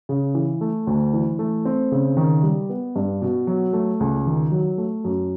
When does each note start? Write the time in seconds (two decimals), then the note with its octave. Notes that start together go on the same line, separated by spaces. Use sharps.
0.09 C#3
0.35 E3
0.61 A3
0.87 D2
1.13 E3
1.39 A3
1.65 C4
1.92 C#3
2.17 D#3
2.43 G3
2.70 B3
2.96 G2
3.22 B2
3.47 F#3
3.73 A3
4.00 C#2
4.26 D#3
4.52 F#3
4.78 A3
5.05 F#2